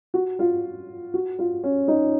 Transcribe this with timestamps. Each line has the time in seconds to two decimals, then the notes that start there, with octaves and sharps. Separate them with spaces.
0.14 F#4
0.39 F4
1.14 F#4
1.39 F4
1.63 C#4
1.88 D#4